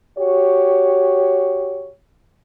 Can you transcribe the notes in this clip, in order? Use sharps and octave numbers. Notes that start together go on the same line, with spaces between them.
F#4 G4 C#5